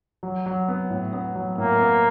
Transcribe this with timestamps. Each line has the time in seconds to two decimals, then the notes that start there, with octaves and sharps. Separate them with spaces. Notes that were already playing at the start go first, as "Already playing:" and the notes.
0.23 F#3
0.46 F#3
0.68 B3
0.90 A2
1.13 B3
1.36 F#3
1.58 A2 A#3
1.80 B3